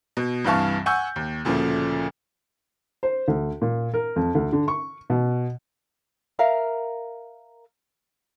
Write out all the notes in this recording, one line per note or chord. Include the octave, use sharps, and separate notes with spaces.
B2
C2 G2 E3 F5 A5 C#6
F#5 G#5 C#6 E6 G6
D#2
D2 A#2 C#3 F3 A3
C5
D2
A#2
A#4
F2
D2
D3
C#6
B2
A#4 E5 F5 A#5